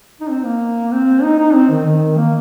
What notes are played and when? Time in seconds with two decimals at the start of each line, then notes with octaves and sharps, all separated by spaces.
0.21 D#4
0.30 C4
0.45 A#3
0.92 C4
1.23 D#4
1.39 D#4
1.55 C4
1.71 D#3
1.86 D#3
2.17 A#3